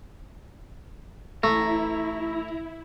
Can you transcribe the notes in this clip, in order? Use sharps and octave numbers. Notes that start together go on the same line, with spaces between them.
A1 A3 E4 A#5